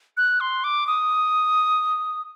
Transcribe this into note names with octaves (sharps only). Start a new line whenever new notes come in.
F#6
C6
D6
D#6